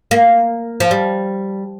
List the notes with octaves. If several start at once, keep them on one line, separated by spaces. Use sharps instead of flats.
A#3
F3
G3